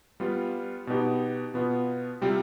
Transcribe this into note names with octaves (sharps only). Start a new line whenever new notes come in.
G3 B3 F4
B2 B3 D#4 G4
B2 B3 F4
C3 G3 C4 F4